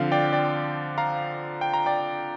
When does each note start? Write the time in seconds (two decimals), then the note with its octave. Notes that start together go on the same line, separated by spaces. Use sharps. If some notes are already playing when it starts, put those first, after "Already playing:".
Already playing: D3 F3 C4 F5
0.12 D5 G5
0.33 D5 G5
0.98 F5 A#5
1.61 G5
1.74 A#5
1.86 D5 G5